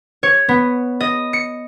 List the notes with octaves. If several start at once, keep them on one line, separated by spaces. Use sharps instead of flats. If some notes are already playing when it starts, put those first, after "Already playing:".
C#5
B3
D#5
C#7